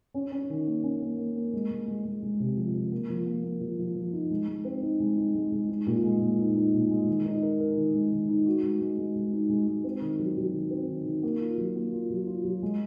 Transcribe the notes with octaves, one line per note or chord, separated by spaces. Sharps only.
C#4
C#4
D#3
A#3
C#4
A#3
A#3
A#3
G#3
G#3
G#3
G#3
G#3
C3
F3
F3
A#3
F3
A#3
A#3
F3
F3
F3
D#4
G#3
G#3
C4
D#4
G#3
D#4
G#3
G#3
D#4
A#2
G#3
A#2
D#4
D#4
A#2
G#3
D#3
D#4
A#4
A#4
D#3
G#3
D#3
D#4
F#4
G#3
G#3
G#3
G#3
D#4
G#3
G#3
C4
D#3
F#3
F#3
D#3
C4
D#3
D#3
A#3
F4
F#3
A#3
F4
F#3
F4
F#3
G#3